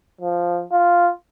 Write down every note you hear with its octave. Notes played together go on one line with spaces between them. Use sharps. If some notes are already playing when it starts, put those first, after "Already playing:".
F3
F4